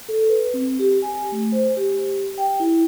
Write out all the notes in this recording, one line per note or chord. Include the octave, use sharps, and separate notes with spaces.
A4
B4
C4
G4
G#5
A3
C5
G4
G5
E4